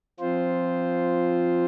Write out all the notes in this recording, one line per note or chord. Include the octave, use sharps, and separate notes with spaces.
F3 C4 F4 C5